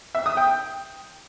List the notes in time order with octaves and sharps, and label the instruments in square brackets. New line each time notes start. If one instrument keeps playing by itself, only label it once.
[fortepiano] E5
D#6
G5